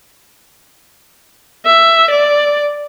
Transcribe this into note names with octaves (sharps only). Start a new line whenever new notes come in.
E5
D5